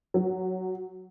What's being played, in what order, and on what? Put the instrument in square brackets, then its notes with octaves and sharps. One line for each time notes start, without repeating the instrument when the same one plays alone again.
[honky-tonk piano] F#3